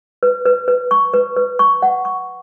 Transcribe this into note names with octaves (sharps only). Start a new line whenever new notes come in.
B4
B4
B4
C#6
B4
B4
C#6
F#5
C#6